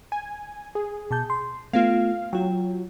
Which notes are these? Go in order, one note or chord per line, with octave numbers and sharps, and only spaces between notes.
G#5
G#4
B2 A5 G6
C6
A3 B3 F4 F5
F#3 F4 G5